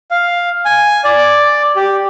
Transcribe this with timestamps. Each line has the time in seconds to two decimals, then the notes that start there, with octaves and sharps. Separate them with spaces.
0.11 F5
0.65 G#5
1.04 D5
1.76 G4